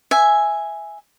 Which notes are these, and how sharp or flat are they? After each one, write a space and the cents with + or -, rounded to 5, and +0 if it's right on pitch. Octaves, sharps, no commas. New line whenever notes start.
E5 +0 G#5 +0